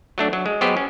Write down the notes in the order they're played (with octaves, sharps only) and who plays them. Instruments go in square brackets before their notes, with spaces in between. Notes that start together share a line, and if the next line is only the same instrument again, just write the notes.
[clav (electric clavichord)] F#3 A3 D4
F#3
G#3
F#3 G#3 B3 G4 C5
C#4